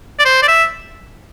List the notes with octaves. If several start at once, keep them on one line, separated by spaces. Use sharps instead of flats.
D5
C5
D5
E5